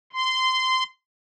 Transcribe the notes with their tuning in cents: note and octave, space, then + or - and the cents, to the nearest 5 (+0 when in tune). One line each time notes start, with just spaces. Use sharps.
C6 -20